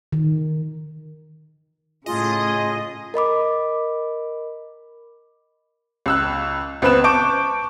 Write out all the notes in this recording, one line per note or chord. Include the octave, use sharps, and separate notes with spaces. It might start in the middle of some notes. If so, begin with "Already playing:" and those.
D#3
A2 C#3 F4 G#4 D#5
A#4 D#5 B5 D6
C#2 E6 F#6
C#2 B3 C4 B4 F#6 E7
A5 C#6 D6 G6 D7